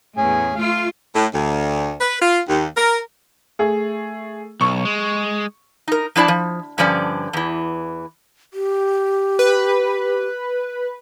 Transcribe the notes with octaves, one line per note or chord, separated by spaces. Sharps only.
E2 A2 C#4 G#4 G#5
A3 F4 F5
A2
D2
B4
F4
D#2
A#4
A3 G#4
B1 C#6
G#3
D#4 A#4
F3 D4 E4 D5 A5
F3
G2 D3 F3 C#4 D5
E2 E3
G4
B4